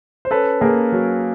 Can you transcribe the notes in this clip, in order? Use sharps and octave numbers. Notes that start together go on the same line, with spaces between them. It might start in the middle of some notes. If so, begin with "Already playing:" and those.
C5
C#4 A4 B4
A#3 G#4 A#4
F#3